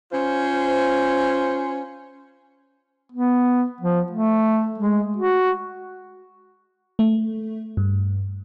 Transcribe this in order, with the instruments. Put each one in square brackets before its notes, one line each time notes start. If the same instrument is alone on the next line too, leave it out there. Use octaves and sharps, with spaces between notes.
[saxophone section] C#4 F4 C5
[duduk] B3
F3
A3
G#3
F#4
[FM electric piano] A3
G2